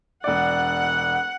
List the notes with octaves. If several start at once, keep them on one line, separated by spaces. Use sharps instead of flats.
E1 D5 F#5